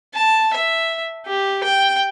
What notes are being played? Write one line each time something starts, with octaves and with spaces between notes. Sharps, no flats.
A5
E5
G4
G5